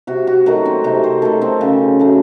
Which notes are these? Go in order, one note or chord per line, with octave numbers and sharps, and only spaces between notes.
C3 F#4
F#4
D#3 F#3 A3 F#4
C4
C3 D#4
C5
D#3 F#3 A3 A4
C4
C#3
F#3 A3